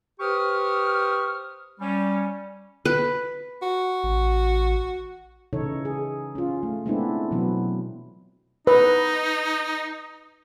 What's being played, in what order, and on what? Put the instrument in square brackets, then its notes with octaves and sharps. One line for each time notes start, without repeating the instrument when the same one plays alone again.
[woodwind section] G4 B4 C5 C#6 D#6 F6
G3 C#4
[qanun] B4
[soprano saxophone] F#4
[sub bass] A1
[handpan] C#3 E3 D#4 A4 C#5
G#4
C#4 F4
A3
G#3 A3 B3 C4 D4 E4
B2 E3 F#3 B3
[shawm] D#4 [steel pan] B4